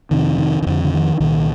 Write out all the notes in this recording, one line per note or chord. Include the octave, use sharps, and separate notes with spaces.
F2 C3 D#3
D#3
D#3
F2 D3 F3
D3
D#3
C2 A#2 D#3